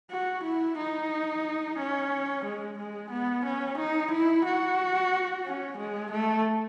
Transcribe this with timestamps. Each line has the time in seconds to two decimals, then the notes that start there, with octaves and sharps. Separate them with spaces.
0.11 F#4
0.44 E4
0.78 D#4
1.78 C#4
2.45 G#3
2.78 G#3
3.11 B3
3.45 C#4
3.78 D#4
4.11 E4
4.45 F#4
5.45 C#4
5.78 G#3
6.11 A3